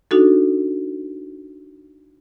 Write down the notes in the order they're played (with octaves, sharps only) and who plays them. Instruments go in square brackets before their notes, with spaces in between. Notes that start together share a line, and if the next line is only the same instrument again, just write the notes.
[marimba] D4 D#4 F#4 A4